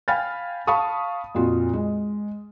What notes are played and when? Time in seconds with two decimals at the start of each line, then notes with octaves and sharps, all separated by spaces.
0.08 F5 G5 G#5 B5 F6 A6
0.67 F5 A5 B5 C#6 D#6
1.35 F2 A#2 F4 F#4
1.74 G#3